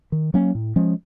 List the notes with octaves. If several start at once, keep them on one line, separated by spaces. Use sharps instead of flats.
D#3
F#3 A#3 C#4
A2
F3 G#3 C#4